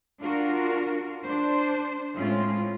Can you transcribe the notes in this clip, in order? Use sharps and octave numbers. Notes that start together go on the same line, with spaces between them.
D4 F4 F#4 A#4
D4 C5
A2 G#3 C4 C#4 F4